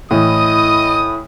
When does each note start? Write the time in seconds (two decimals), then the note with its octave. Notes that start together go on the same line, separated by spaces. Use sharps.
0.11 A2 E3 E4 D#5 D#6